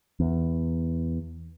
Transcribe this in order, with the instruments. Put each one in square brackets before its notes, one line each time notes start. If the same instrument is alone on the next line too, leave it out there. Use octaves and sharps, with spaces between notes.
[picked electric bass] E2